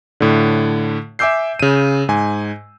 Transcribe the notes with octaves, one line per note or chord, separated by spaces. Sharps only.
A2 D3
E5 G#5 D6 E6 G6 C7
C#3 D#7
G#2 G#5